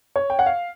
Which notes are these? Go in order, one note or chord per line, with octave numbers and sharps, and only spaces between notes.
C#5
G5
F#5
F5